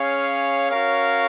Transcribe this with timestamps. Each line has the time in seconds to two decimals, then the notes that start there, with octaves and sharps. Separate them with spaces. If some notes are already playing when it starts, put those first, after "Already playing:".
Already playing: C#4 G#4 C#5 F5
0.70 C#4 F#4 A#4 C#5 F5